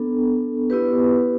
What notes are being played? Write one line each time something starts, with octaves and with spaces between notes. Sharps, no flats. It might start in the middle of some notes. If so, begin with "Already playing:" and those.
Already playing: B3 D4 A4
B3 E4 G4 B4